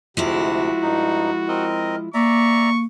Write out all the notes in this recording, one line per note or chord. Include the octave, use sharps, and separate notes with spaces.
D2 C3 F3 G#3 E4 F#4
G2 D#4
C4 A#4 D#5
A#3 D5 E5 A#5 C#6